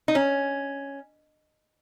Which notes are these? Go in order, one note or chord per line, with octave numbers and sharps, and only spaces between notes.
D#4
C#4